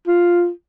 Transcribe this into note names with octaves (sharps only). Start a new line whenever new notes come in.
F4